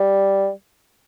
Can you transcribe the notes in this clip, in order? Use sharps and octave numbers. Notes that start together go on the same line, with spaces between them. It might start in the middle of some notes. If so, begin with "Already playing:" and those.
Already playing: G3